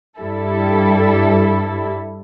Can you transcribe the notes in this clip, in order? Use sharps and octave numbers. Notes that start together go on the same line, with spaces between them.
G2 G3 E4 A4